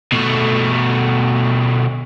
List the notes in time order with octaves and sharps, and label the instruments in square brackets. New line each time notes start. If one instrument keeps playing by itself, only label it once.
[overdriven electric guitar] B2 A3